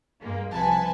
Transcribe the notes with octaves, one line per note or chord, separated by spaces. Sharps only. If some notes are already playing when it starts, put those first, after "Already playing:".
G2 G#3 A#3
C2 C3 F3 B4 G#5 A5